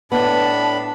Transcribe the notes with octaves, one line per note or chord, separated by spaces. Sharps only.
A2 B3 D4 A5 B5